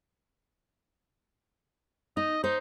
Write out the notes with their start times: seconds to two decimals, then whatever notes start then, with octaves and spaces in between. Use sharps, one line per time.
2.17 D#4 D#5
2.44 D#4 C5